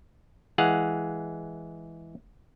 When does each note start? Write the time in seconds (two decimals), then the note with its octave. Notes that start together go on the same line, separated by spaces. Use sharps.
0.58 E3 G#3 G#4 F5 F#5